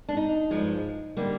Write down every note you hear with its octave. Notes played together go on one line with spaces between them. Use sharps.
D4
D#4
G2 F3 G#3
D3 G3 A#3